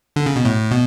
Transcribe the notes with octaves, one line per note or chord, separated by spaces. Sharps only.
D3
C#3
B2
A2
B2